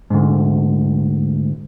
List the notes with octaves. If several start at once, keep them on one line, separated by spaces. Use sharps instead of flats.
D2 G#2